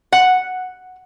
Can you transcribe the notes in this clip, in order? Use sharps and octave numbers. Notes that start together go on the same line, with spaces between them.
F#5